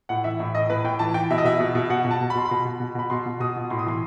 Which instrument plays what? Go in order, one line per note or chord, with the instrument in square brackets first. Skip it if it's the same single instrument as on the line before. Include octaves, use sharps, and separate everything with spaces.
[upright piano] A2 F#5
E3 E5
A2 E5
A2 D#5
A2 B4
A2 G5
E3 A5
E3 G5
B2 E5
D#5
B2 E5
B2
B2
B2 F#5
B2
A5
B2
B5
B2 C6
B5
B2
B2
B2
B2 B5
B2 C6
B2
B2 D#6
B2
A2 C6
D#6
E3 C6